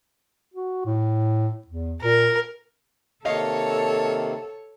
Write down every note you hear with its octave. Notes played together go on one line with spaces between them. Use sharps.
F#4
A2
E2
A#2 A#4
C3 D#3 A#3 A4 C#5 D#5 F5